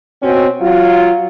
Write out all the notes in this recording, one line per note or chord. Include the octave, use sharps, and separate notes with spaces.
B2 C4 C#4 F#4
F#3 F4